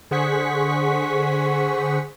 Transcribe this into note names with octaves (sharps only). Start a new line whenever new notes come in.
D3 G#4 C5 F#5 C#6 B6